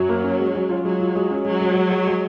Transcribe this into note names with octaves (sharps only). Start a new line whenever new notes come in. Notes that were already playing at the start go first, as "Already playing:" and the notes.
Already playing: F#2 F#3
A#3
C#4
G#3
C#4
F4
F#3 G#3
F4
G#3
C#4
F#3 G#3
G#3
G#3
G#3
G#3